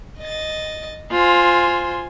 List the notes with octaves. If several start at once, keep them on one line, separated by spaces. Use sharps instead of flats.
D#5 A6
F4 C5 G#5